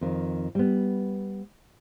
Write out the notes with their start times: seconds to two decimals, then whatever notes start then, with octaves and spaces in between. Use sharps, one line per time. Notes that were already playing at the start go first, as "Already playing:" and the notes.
0.01 F2 D#3
0.55 G3 B3